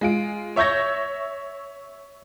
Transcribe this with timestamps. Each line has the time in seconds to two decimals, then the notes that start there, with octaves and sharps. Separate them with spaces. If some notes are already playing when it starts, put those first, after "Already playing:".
0.01 G#3 F4 D7
0.56 C#5 E5 C#6 G6 G#6 A#6